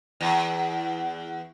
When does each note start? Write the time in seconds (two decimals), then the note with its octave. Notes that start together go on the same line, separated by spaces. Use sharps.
0.21 E2